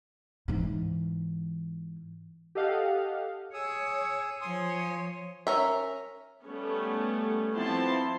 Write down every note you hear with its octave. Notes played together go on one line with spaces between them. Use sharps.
G#2 E3
G4 A4 D#5 F5 F#5
G#4 C#5 D#6 E6
F3 C#5 G#5 C6 D#6
C#4 A#4 E5
G3 A3 B3 C#4
F3 B3 C4 E4 A5 C6